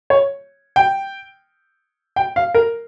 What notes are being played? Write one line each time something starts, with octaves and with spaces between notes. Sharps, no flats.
C#5
G5
G5
F5
A#4